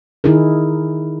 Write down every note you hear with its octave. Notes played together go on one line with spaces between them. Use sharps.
D#3 D#4 E4 G#4 A#4